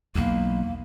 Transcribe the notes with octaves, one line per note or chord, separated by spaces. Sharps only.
B1 E2 A#3